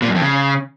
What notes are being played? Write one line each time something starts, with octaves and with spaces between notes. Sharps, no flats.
A#2
F#2
F2
C#3